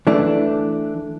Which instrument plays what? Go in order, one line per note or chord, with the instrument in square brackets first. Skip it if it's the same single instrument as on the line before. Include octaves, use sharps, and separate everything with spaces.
[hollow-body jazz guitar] E3 A3 D4